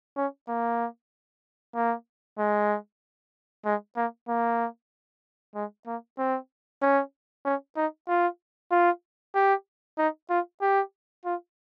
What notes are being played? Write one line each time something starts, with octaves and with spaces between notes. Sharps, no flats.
C#4
A#3
A#3
G#3
G#3
A#3
A#3
G#3
A#3
C4
C#4
C#4
D#4
F4
F4
G4
D#4
F4
G4
F4